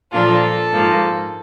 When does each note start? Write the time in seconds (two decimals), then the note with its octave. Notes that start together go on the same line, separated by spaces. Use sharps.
0.11 A#2 F3 A#3 D4 F4 A4
0.72 G#2 F3 A#3